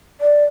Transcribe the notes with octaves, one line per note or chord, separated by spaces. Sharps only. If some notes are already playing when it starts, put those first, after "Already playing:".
D5